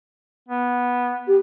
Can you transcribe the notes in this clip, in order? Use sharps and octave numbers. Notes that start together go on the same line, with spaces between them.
B3
G4